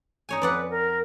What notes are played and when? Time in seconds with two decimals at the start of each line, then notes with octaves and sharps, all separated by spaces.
0.29 D#4 C#5 G#5
0.42 F2 B4 D5 F#5
0.70 A#4